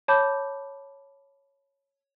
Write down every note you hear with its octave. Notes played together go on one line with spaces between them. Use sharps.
C#5 A5 B5 D6 G6